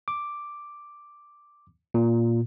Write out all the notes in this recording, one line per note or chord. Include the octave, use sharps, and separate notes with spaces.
D6
A#2